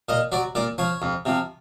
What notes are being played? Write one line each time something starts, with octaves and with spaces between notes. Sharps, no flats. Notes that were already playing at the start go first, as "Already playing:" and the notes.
A#2 D#5
F#3 D5
A#2 D5
F3 C#5
F2
C3 F3